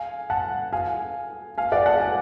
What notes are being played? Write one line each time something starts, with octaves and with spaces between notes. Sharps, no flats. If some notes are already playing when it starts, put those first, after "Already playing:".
Already playing: F5 G#5
F#5 A5
F5 G#5
F5 G#5
D5 F#5
F#5 A5
F5 G#5